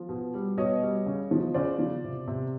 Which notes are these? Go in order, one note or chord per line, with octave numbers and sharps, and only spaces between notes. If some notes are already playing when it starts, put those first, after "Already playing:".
Already playing: F3
B2
G3
B2 C#5 D#5
G3
C#3
F3
C#3 C5 D5
F3
C3
C3